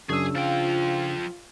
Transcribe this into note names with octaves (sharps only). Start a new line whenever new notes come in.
F#2 C#3 D4 G#4 E6
F3 F4 G5